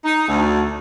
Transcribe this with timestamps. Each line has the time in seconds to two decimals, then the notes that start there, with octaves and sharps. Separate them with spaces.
0.04 D#4
0.28 D2